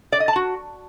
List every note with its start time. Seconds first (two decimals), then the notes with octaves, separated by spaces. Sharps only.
0.12 D5
0.20 D#5
0.28 A5
0.36 F#4